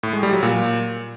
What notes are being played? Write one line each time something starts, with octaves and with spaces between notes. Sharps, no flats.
A2
G#3
G3
F#3
A#2